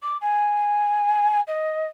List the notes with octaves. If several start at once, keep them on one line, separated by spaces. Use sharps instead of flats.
D6
G#5
D#5